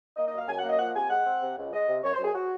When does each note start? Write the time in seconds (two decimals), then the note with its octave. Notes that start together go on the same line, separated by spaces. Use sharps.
0.16 A#3 D#5
0.28 D#5
0.33 F#2 F5
0.48 F#2 G#5
0.58 F#5
0.64 A#3 D#5
0.78 F3 F#5
0.95 C3 G#5
1.10 G#3 F#5
1.26 C4
1.41 C3
1.57 C#2
1.72 G#3 D#5
1.88 C3
2.03 F#2 C#5
2.13 C5
2.19 F#2
2.24 G#4
2.34 F#4